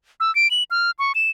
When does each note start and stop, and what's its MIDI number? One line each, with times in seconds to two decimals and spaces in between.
0.20 0.34 88
0.35 0.50 98
0.51 0.63 102
0.71 0.91 89
0.99 1.12 85
1.15 1.30 100